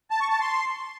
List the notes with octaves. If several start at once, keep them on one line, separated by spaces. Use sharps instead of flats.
A5
C#6
A5
C6